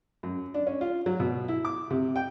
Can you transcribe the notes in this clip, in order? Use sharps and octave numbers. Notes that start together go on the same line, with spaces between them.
F#2
D4
C#4
F4
F#3
B2
E4
D6
C3
G5